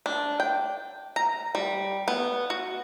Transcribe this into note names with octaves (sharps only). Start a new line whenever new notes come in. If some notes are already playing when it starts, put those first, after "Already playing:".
D4
G5
A#5
G3
B3
F#4